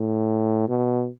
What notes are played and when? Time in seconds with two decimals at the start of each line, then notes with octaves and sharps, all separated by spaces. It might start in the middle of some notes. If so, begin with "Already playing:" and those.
Already playing: A2
0.69 B2